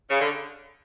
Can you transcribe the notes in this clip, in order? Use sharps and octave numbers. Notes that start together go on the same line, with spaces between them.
C#3
D3